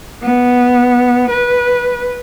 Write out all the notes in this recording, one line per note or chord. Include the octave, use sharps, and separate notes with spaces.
B3
B4